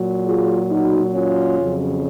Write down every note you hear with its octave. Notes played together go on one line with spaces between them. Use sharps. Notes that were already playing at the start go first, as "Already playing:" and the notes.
Already playing: A#2 F#3
F4 G#4
D#4 F#4
C#4 F4
F2 C#3 F#3